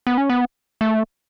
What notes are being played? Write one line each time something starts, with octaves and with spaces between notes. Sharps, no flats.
B3
C#4
B3
A3